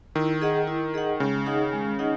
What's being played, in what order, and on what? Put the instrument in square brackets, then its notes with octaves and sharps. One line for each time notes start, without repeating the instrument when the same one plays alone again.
[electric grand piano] D#3 [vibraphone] E4
[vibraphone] G#4 D#5 F#5
E4
G#4 D#5 F#5
[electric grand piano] C#3 [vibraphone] G#3
[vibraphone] D#4 G#4 D#5 F#5
G#3
D#4 G#4 D#5 F#5